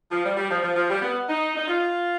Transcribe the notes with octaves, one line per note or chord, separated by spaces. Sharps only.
F3
G3
G3
F3
F3
F3
G3
B3
D#4
D#4
F4